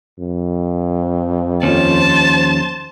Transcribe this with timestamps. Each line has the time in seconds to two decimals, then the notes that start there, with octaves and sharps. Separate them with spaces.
0.19 F2
1.63 D#2 F3 C#4 C5 A5